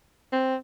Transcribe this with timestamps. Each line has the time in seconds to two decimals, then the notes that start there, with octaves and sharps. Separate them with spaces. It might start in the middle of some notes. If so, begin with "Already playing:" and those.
0.32 C4